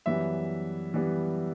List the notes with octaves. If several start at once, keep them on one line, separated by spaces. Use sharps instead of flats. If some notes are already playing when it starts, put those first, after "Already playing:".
F#2 E3 G3 B3 E5
E3 G3 B3